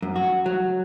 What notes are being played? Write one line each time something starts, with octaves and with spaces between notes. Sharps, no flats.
F#2
F#4
F#3